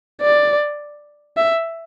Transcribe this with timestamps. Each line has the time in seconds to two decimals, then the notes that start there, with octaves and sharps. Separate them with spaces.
0.21 D5
1.37 E5